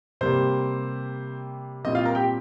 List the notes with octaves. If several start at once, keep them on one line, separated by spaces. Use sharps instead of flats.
C3 G3 A#3 C5
A#2 G3 C4 D#5
F4 F5
A#4 A#5
G4 G5